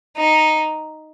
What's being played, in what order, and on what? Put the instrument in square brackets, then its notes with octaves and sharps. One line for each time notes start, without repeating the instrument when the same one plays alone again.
[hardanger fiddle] D#4